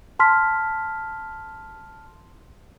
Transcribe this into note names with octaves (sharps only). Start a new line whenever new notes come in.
A5 C6 F6 B6